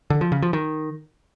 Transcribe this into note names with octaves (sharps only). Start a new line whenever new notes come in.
D3
F3
C#3
F3
D#3